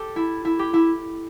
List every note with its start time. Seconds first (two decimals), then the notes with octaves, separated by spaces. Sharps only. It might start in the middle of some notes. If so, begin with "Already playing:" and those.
Already playing: G4 A4
0.16 E4
0.45 E4
0.59 G4
0.73 E4